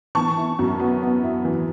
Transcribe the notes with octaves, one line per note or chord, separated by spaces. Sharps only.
E3 A5 C#6
E4
F#2
B3
B3
E4
E3